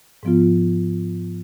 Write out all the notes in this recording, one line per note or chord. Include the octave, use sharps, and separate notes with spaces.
G#2 F3 B3 F4